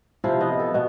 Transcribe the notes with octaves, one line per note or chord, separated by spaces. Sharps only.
C3 F3 E4 F5
B3 D#5
A4
B2 B3